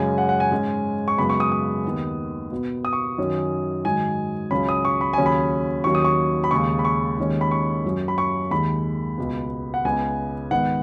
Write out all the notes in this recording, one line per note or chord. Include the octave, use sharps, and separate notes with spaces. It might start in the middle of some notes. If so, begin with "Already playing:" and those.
Already playing: F#2 C#3 G#3 C#4 G#5
F#5
F#5
G#5
G#2 G#3 C#4
C#6
F#2 C#3 G#3 B3 B5
C#6
D#6
D#6
D#2 D#3 B3
B2 B3
D#6
C#6
F#2 D#3 F#3 C#4
G#2 D#3 F#3 G#5
C#2 C#3 F#3 C#4 B5
D#6
C#6
B5
D#2 C#3 F#3 C#4 G#5
B5
D#2 D#3 F#3 C#4 C#6
D#6
C#6
B5
D#2 C#3 G#3 C#6
B5
C#6
D#2 D#3 G#3 C#4
B5
C#6
F#2 F#3 C#4
B5
C#6
D#2 D#3 G#3 B5
C#2 B2 B3
F#5
C#2 C#3 B3 G#5
G#2 D#3 B3 F#5